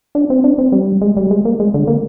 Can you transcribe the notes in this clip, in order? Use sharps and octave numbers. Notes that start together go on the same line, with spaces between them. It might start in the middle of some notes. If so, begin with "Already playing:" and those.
D4
C4
D4
C4
G3
G#3
G3
G#3
A#3
G#3
D3
A#3